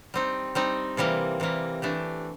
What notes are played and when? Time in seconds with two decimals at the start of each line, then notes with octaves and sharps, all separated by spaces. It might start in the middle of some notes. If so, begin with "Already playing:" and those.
0.14 G3 C4 D#4
0.55 G3 C4 D#4
0.97 C3 E3 G3 A#3
1.40 C3 E3 G3 A#3
1.82 E3 A3 D4 G4